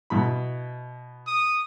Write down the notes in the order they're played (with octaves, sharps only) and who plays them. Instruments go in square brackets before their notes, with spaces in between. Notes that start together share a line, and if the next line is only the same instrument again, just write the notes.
[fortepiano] B2 E4 B5
[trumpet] D#6